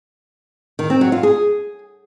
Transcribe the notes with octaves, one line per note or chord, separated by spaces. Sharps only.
D#3
C4
F#3
F4
G#4